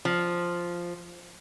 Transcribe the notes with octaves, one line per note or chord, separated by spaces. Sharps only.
F3